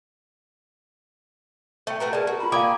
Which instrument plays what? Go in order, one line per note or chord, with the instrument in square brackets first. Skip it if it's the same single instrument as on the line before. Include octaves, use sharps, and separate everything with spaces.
[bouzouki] A3 [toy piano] E5 G5
[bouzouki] A3 F#4 A#4 [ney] B4
[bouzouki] G#4 A5 [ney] A#4 [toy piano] D5
[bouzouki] F#4
[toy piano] F4 A#5 [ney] B5
[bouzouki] A#3 G5 G#5 [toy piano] A4 D5 F5